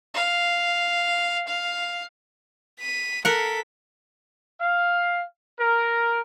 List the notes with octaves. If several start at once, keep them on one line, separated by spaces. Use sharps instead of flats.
F5
F5
B6 D#7
A4 A#4 F#5 B6
F5
A#4